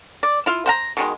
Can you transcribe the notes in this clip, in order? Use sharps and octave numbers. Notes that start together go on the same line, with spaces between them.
D5
E4 F4
C5 F#5 A#5
B2 D#3 G#3